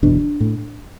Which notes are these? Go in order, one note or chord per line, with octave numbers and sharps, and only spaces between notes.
F#1 E2 B2 D4
A2